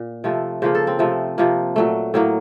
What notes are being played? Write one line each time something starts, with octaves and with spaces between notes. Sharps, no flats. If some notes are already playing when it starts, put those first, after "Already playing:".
Already playing: A#2
C3 F3 A3
C#3 F3 A#3 C5
A4
C4
C3 F3 A3
C3 F3 A#3
A#2 F#3 A3
A2 F#3 A#3